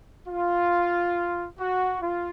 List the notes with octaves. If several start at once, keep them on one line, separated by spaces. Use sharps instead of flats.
F4
F#4
F4